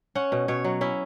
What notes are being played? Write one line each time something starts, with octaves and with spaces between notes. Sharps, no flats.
C#4 F#5
B2
B2 C#5
F#3
C#4 E4